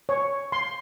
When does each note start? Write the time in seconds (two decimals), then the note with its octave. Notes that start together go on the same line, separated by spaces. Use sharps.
0.09 C#5
0.52 C6